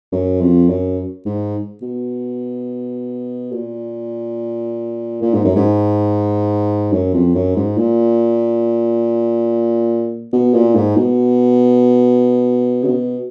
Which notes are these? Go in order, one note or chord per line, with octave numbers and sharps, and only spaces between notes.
F#2
F2
F#2
G#2
B2
A#2
A#2
G#2
F#2
G#2
F#2
F2
F#2
G#2
A#2
B2
A#2
G#2
B2
C#3
B2